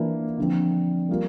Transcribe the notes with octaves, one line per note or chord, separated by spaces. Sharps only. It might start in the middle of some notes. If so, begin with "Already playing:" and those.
Already playing: E3 A#3 D4 F4
D3 F3 C4
G3 A#3 F4